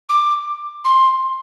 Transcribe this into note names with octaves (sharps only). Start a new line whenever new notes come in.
D6
C6